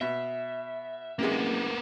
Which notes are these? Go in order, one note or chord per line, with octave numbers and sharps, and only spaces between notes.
B2 E5
F#1 C3 G#3 A#3 B3